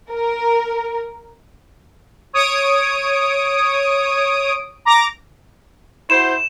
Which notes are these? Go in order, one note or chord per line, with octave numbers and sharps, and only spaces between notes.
A#4
C#5 D#6 D7
A#5 D6 A#6
E4 F#4 C5 E7